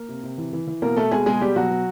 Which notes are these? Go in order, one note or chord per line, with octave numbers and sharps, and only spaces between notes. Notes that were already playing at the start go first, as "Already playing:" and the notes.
Already playing: A#3 A#4
C3
C3
E3
E3
E3
B2 A#3 A#4
B2 A3 A4
B2 G#3 G#4
B2 G#3 G#4
B2 G3 G4
B2 F#3 F#4
B2